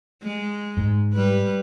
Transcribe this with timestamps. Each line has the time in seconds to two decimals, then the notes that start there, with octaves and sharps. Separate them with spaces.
0.23 G#3
0.77 G#2
1.13 G3 B4